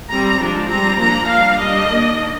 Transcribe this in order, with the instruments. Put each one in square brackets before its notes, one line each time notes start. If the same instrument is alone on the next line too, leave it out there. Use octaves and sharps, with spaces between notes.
[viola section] G3 C4 A#5
F3 G#3 D4
G3 C4 A#5
F3 A#3 D4 A#5
G3 D4 F5
G3 D4 D#5
D#3 A#3 D4